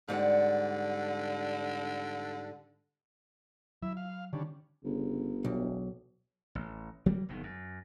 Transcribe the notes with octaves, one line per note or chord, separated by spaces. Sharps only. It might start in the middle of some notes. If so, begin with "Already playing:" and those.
G#2 D3 G3 F#5
F#3 E4 E5
F5
D3 D#3 G3 C#4 D4
G1 C#3
E1 B1
A1
F#3 G3 A#3
F#1 B2 D#3
F#2